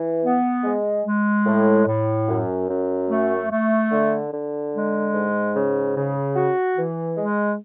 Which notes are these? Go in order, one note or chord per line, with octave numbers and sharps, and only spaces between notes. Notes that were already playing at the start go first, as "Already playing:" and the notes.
Already playing: E3
B3
G#3
G#3
A2
A2
F#2
F#2
A3
A3
D3
D3
G#3
G#2
C#3
C#3
F#4
E3
G#3